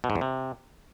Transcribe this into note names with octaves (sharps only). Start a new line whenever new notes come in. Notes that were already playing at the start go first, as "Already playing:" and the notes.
B2
G#2
E2
C3